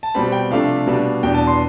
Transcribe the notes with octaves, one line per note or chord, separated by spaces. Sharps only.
A5
B2 G3 C4 B5
G5
C3 F3 A3 D4 F5
B2 G3 D4
E2 B2 B3 D4 G5
A5
C6